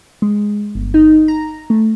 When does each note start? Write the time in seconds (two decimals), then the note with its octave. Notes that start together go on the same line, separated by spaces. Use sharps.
0.22 G#3
0.75 G1
0.94 D#4
1.28 A#5
1.70 A3